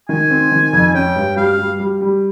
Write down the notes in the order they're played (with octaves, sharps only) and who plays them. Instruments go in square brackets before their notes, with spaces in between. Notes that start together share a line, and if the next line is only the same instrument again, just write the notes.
[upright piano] D#3 [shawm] G#5
[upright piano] C4
D#3
F2
[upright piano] C#4 [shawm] G5
[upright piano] G2
[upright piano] G3 [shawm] F5
[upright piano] G3
G3
G3